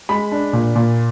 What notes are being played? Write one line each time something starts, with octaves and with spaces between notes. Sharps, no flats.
G#3 B5
D4
A#2
A#2